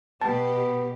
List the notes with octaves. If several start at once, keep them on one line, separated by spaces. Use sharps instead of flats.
B2 B3 G4 A5